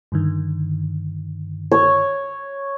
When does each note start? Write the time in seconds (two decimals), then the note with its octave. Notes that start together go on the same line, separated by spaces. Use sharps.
0.12 G2 D3 D#3
1.72 C#5